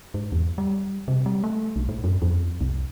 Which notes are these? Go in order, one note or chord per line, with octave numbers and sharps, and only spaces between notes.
G#2
E2
G3
C3
G3
A3
B1
A2
F#2
F2
C2